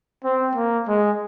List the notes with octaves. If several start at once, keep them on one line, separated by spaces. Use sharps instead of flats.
C4
A#3
G#3